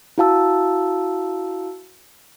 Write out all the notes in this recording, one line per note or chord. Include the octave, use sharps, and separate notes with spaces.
E4 F#4 F5 A5 E6